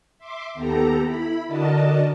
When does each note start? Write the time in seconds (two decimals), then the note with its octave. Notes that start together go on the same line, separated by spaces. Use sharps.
0.18 E5 C6 D6
0.54 D#2 B3 G4 A4 A#5
1.05 E4 B5
1.46 D3 D4 F#4 A#4 D#5 A5